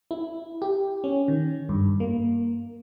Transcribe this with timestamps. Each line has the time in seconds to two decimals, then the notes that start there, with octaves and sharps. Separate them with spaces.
0.11 E4
0.62 G4
1.04 C#4
1.28 D#3
1.69 G2
2.00 A#3